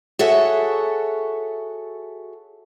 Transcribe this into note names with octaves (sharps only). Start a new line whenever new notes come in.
F#4 G#4 A4 C#5 E5 F#5